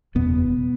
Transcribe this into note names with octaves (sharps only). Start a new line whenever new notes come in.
F#1 E2 B2 B3